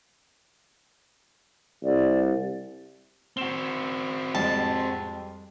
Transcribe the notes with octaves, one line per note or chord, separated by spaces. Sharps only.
C2 D5
C4 F#4 E7 G7
F2 G3 G#3 A5